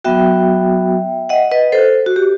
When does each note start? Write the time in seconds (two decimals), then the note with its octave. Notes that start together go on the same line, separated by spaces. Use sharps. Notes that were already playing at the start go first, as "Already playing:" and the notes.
0.04 F#3 B3 F#4 E5 G5
1.29 D#5 F#5
1.52 B4 D#5
1.72 A4 C5
2.06 F#4
2.16 G4